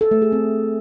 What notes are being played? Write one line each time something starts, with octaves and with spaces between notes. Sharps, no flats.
A4
A3
G#4
C4